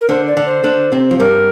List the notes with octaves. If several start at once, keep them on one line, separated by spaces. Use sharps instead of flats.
A#4
D3 D4 C5
D5
D3 D4
C5
D3 D4
C3 C4
F3
G2 G3 A#4